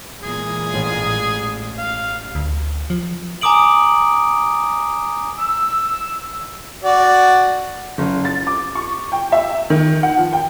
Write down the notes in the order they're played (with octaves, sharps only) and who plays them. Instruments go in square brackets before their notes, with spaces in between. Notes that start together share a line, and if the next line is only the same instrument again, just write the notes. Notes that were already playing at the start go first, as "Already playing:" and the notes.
[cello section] A#2 E3 G#3 [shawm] G#4
[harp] A1
[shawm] F5
[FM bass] D2
F3
[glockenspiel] G#5 A#5 D6 D#6 D7 F#7
[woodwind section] E6
[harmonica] F#4 D5
[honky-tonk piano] F#1
A6
D6
C#6
G5
E5
D#3
F#5
F3
G5